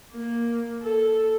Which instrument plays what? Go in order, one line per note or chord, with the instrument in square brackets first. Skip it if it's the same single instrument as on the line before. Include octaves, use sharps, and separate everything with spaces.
[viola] A#3
A4